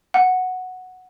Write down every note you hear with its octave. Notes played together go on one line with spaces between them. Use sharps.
F#5